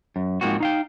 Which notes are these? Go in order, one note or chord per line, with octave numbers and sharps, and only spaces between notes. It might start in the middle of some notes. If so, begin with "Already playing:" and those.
F#2
G#2 F3 A#3 C4 F#4
D#4 F5 G5